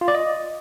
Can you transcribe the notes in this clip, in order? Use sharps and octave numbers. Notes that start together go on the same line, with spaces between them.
F4
D5
D#5